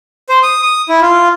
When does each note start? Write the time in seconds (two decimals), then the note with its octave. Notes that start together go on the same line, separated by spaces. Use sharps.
0.29 C5
0.43 D#6
0.62 D#6
0.89 E4
1.01 F4